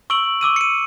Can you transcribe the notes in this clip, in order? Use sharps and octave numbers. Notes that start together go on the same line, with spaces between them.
C#6 E6 D7 F#7
C#6 D6 E6 D#7
C#7 D#7